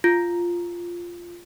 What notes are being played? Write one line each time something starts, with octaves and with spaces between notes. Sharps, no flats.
F4